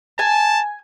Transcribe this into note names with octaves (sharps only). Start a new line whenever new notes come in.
G#5 A5